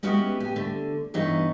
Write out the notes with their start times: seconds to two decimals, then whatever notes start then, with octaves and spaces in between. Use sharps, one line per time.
0.03 G#3 B3 C#4 E4 F#4 G4
0.40 G4 G#5
0.56 D3 A3
1.14 G2 E3 B3 D#4 C#5